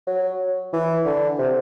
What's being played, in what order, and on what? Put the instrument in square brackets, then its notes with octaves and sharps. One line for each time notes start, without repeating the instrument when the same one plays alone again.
[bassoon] F#3
E3
D3
C3